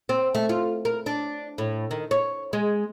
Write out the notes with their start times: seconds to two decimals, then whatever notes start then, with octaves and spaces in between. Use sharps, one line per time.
0.09 C4
0.35 A3
0.49 F4
0.85 A#4
1.06 D4
1.58 A2
1.91 D#3
2.11 C#5
2.53 G#3